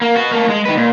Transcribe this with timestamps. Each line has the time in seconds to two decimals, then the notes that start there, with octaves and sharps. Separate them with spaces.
0.02 A#3
0.16 B3 F#4
0.31 A3 A#3
0.49 G#3
0.65 D#3 B4
0.77 A#2